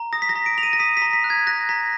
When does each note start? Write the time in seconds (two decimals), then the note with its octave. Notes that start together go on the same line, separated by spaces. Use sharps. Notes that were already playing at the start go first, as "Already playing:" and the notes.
Already playing: A#5
0.13 D#6 A#6
0.22 B6
0.29 A#6
0.36 A#5
0.46 D7
0.57 A#5 F7
0.63 D#7
0.73 A#6
0.79 D#6 B6
0.97 B6
1.02 A#5
1.13 B6
1.24 F#6
1.30 G#6
1.47 F#6 A#6
1.69 A#5 B6